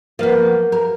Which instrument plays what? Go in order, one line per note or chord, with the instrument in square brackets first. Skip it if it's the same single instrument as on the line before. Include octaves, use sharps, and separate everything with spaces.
[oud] F3 B3 [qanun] A#3 F5
[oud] A#4